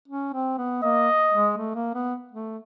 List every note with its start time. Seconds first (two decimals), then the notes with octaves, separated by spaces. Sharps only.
0.08 C#4
0.33 C4
0.58 B3
0.83 A#3 D#5
1.32 G#3
1.58 A3
1.75 A#3
1.94 B3
2.32 A3